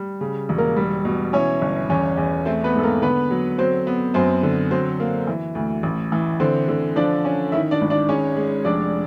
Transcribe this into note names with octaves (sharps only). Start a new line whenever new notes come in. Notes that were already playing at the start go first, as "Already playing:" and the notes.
Already playing: G3
C#3
E1
A#3 A#4
G3
B2
E3 C#4 C#5
G1
E2 C#4 C#5
E2
A3 C4 C5
B3 B4
G#2
A4
A#3 A#4
D3 B3 B4
F#3
F#3 C4 C5
B3
F#2 C4 C5
D3
F#3 C4 C5
A#3
E3
D2
A1
E3
D3 C4 C5
D3
F3 D4 D5
C#4
D#3 E4 E5
D4 D5
G#1
D4 D5
G#3 C#4 C#5
G#3
F1 D4 D5